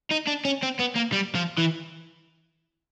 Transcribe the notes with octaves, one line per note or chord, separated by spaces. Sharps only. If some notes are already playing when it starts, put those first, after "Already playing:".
D#4
D4
C#4
C4
B3
A#3
G3
F3
E3